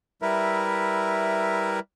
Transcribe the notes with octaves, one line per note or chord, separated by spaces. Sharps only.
G3 E4 A#4 B4 E5